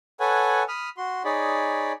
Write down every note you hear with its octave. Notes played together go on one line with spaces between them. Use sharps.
A4 B4 C#5 F#5 G#5
B5 D#6 F6
F#4 C6
D#4 G#4 C#5 D5 B5